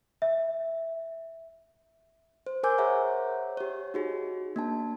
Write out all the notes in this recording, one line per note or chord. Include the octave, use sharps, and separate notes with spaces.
E5
C5
A#4 C5 G#5 D6 E6 G6
G#4 C5 C#5 E5 F#5 A#5
G4 C#5
D#4 F#4 G#4
A#3 D4 A5